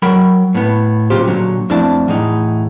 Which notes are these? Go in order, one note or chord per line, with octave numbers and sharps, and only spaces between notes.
F#3 A#4 G5 B5
A2 B3
A#2 C#3 F#3 F4 G4 C5
A#2 D3 F#3
F2 A3 D4 E4 D5 A5
E2 A2 D#4